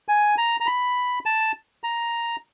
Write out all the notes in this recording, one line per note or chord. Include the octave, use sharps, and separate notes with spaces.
G#5
A#5
A#5
B5
A5
A#5